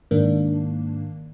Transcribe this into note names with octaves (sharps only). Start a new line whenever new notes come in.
G#2 D#3 A#3 D4